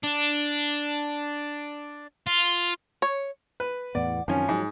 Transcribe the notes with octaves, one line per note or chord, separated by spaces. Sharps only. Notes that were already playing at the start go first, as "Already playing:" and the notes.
D4
F4
C#5
B4
E2 A2 B3 D5 F#5
F#2 D#3 F3 C4 C#4 G#5
G#2 F3 F#3